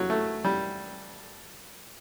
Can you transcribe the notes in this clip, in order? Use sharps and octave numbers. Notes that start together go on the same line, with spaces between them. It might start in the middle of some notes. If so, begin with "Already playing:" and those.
Already playing: F#3
A3
G3